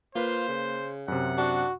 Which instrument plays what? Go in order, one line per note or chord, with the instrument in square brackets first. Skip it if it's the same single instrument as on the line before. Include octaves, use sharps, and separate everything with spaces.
[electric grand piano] A#3 B4 [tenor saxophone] F4 [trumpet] C5
[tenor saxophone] C#3
[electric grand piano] F#2 C3 [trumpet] F#5
[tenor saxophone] D4 [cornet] F#4